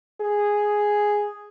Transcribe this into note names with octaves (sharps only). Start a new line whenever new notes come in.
G#4